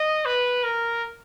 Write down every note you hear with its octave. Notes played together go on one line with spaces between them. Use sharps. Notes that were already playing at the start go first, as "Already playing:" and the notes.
Already playing: D#5
B4
A#4